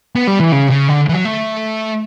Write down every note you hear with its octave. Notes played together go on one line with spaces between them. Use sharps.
B3
G3
E3
C#3
C#3
D3
E3
F#3
A3